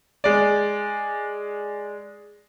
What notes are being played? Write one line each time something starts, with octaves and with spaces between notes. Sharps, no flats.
G#3 D5